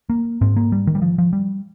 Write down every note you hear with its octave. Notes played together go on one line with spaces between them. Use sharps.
A#3
G#2 C4
A#3
G3
D#3
G3
F3
F3
G3